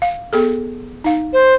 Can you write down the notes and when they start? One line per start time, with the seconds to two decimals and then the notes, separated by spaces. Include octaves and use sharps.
0.02 F5
0.33 B3 G#4 A4
1.04 D#4 F5
1.33 C5